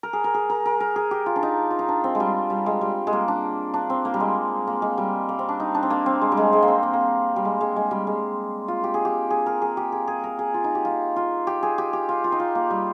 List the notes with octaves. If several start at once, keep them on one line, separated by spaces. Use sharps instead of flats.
A#4
G#4
A#4
G#4
A#4
A#4
A#4
G#4
G4
F4
D4
D#4
F4
D#4
D4
C4
G#3
G3
G3
G#3
G3
G#3
A#3
D4
D4
C4
A#3
G3
G#3
A#3
G#3
G3
A#3
C4
D4
D#4
D4
C4
A#3
C4
G#3
G3
G#3
G#3
A#3
C4
A#3
A#3
G3
G#3
G#3
G#3
G3
G#3
F4
G4
G#4
G4
G#4
A#4
G#4
G4
G#4
G#4
A#4
G#4
F4
D#4
G4
F4
F4
G4
G#4
G4
G4
F4
F4
D#4
F4
A#3
G3